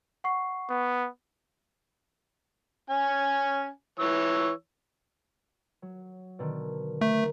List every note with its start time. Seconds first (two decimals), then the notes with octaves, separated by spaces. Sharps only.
0.24 F#5 C#6 C7
0.70 B3
2.90 C#4 G#5
3.99 E3 C#5 E6
5.82 F#3
6.39 B2 D3 D#3
7.01 A3 A#4